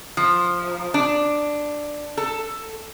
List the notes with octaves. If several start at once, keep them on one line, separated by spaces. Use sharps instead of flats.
F3
D4
A4